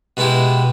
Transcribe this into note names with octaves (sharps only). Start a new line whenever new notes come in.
B2 G#3 B3 E4 G4